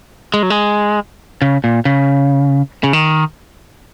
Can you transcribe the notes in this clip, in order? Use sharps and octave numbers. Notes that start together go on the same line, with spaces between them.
G#3
F#3
G#3
C#3
A#2
C#3
C#3
D#3